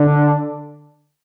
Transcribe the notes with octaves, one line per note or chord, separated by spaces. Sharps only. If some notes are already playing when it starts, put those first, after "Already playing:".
Already playing: D3 D4